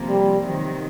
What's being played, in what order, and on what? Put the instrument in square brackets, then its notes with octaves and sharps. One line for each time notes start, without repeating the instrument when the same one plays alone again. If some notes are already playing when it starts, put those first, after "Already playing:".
Already playing: [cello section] C3 F3 A#3
[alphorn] G3
[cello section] C3 D#3 F#3